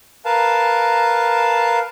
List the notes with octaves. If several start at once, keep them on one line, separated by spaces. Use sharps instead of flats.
A#4 B4 F5 A5